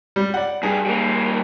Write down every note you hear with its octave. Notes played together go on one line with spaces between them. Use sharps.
G3
D5 F#5
G2 G#4
G3 A#3